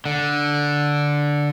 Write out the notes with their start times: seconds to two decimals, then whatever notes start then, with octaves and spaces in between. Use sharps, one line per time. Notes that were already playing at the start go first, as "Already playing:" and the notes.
0.06 D3